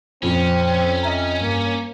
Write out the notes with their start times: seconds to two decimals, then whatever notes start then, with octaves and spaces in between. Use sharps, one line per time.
0.23 F2 A#2 F3 C4 C#4
1.03 D#5 E5 A#5
1.41 G2 A#3